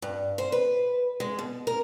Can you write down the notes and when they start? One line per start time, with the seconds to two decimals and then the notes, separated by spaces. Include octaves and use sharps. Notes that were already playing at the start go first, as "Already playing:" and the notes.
0.02 G2
0.38 C5
0.52 B4
1.20 G#3
1.39 B2
1.67 A#4